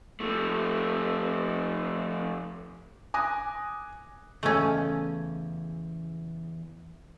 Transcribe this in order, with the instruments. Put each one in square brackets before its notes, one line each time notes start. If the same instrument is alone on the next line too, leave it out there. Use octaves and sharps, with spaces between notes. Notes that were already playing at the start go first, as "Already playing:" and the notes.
[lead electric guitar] F3 A3
[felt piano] G#5 D6 D#6 F#6 A#6
[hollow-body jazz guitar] E2 C#3 D#5 [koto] A3 C#4